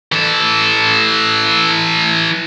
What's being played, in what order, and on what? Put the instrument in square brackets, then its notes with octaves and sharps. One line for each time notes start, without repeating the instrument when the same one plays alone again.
[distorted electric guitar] E3 A4